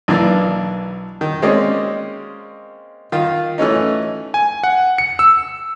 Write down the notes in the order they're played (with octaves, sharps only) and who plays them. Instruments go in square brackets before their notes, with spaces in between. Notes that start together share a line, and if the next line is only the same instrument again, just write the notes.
[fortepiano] B1 E3 A#3 D4 D5
D#3
G#3 A#3 C4 C#4 D5 D#5
D#3 F4
E3 A3 C#4 D#4
[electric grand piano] G#5
F#5
C#7
E6